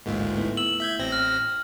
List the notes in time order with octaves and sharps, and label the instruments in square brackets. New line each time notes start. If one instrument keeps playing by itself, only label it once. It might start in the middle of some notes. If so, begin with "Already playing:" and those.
[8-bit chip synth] A1 D2 G#2 [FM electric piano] G#3 A#3 F4
[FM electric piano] A3 B3 E4
[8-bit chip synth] E6 [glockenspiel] F#7
[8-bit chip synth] E5 G6 G#6
A1 C4 A#6
[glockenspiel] F6